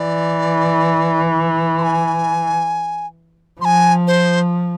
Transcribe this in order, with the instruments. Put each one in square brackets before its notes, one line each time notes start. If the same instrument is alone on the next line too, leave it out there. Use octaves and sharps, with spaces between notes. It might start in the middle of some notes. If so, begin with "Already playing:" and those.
Already playing: [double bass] E3 [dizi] D5
[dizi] C6
G#5
[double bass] F3 [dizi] C6
[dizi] G#5
C5